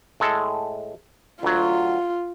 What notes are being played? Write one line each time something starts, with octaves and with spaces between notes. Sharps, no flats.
A2 G#3 A4
D2 F#3 F4